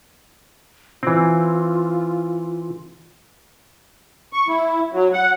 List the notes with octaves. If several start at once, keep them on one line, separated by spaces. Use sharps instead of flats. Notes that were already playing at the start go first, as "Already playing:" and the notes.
E3 C4 F4
C#6
E4
F#3
F#5